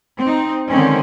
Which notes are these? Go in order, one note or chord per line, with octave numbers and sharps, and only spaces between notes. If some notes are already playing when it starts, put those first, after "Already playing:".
C4 D#4
D3 D#3 G#3 C4 C#4